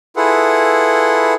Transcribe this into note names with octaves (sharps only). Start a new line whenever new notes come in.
E4 F4 G#4 A4 B4 F#5